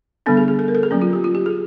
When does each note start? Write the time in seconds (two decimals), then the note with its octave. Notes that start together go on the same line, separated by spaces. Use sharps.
0.26 D3 G3 B3 D4 A4
0.37 G#4
0.48 G#4
0.59 A4
0.68 A#4
0.75 A4
0.83 G#4
0.91 F#3 A#3 C#4
1.02 F4
1.13 G4
1.24 F4
1.35 G4
1.46 G#4